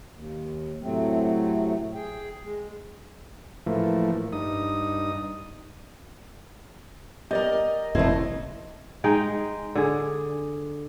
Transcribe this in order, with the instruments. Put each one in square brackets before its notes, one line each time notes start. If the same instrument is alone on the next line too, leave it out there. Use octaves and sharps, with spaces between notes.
[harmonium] D#2
A2 C3 F#3 A3 C4
G#4 G5
G#3
[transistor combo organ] A2 E3 F3 A3 A#3
G2 D#4 D#6
[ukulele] G4 D5 [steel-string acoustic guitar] A#4 D#5
[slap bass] F1 F2 [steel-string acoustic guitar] A3 C4 [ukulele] E4 D#5
[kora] G#3 D#4 G5
D3 G#4